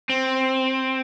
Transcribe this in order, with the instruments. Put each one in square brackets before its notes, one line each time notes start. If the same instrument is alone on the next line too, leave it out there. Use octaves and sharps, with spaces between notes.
[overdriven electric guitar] C4